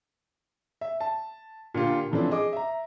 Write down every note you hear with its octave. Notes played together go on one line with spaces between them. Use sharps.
E5
A5
A#2 D3 A#3 F4 G4
A2 E3 F3 A3 C4 D4
G#4 D#5 D6
E5 A#5